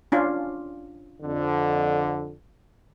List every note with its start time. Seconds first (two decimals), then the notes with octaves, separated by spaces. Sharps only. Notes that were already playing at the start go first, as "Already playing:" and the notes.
0.12 C#4 D4 F4
1.22 F2 D3